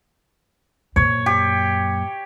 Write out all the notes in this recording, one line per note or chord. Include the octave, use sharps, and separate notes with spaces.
F#2 A#2 C#5
G4